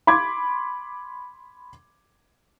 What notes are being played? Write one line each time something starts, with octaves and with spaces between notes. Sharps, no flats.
B5 C6 D6 G#6